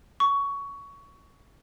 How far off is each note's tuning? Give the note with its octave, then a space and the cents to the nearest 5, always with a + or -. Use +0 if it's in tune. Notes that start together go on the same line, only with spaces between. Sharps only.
C#6 +15